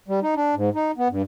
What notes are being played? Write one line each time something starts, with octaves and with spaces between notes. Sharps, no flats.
G3
D#4
D4
G#2
D#4
B3
G2